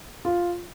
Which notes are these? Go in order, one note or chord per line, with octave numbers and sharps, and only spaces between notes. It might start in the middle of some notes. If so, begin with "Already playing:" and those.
F4